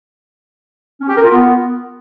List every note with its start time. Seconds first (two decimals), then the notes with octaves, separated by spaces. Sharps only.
1.01 C#4
1.09 G4
1.16 A#4
1.24 F4
1.31 B3